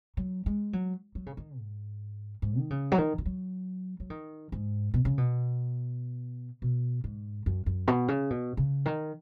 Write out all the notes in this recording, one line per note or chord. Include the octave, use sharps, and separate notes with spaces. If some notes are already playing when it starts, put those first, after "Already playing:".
F#3
G#3
F#3
F#3
C#3
D#3
G#2
G#2
D#3
C#3
F#3
D#3
D#3
F#3
F#3
D#3
G#2
B2
C#3
B2
B2
G#2
F#2
F#2
B2
C#3
B2
C#3
D#3